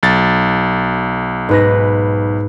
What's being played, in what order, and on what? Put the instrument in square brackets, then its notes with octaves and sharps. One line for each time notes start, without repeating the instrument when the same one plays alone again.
[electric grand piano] B1 A6
[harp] G#2 B4 A#6